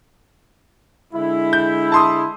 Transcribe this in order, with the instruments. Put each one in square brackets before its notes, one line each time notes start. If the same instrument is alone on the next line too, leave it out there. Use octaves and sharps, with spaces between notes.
[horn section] D3 G#3 E4
[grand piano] G6
A5 C6 D#6